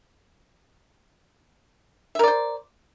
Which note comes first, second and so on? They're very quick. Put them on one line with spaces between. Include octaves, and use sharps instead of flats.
E5 A#4 D5 C5